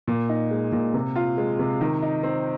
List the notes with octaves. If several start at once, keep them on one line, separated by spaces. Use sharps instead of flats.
A#2
D#4
G#3
A#2
C3
F4
G#3
C3
D#3
D#4
C4